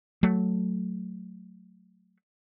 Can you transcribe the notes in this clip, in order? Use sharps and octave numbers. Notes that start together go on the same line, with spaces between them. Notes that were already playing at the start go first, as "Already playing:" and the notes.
F#3 A3